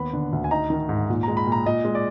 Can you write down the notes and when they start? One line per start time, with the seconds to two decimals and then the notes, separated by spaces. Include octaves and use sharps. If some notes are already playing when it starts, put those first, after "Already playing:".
Already playing: D#2 B3 B5
0.13 D3
0.33 D2
0.44 G#5
0.51 D#4 A#5
0.70 D#3
0.89 G#2
1.09 A#2
1.23 G#3 A#5
1.37 B5
1.47 A#2
1.52 A#5
1.66 A#2 D#5
1.85 G#3
1.95 D5